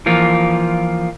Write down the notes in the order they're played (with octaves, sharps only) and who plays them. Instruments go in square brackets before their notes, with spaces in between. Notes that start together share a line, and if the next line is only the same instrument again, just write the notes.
[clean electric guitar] E3 F3 A#3 F4